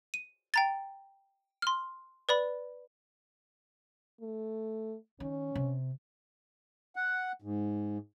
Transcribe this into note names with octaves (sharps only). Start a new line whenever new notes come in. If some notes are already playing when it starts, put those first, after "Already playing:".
D#7
G5 A#5 A6
C6 F6
B4 D5 B5
A3
D#3 C#4
C3
F#5
G#2